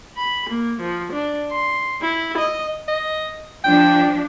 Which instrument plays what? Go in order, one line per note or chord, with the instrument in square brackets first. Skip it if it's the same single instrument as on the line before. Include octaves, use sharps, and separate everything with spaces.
[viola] B5
A#3
F3
D4
C6
E4
D#5
[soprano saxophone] D#5
[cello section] F3 D4 [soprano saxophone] G5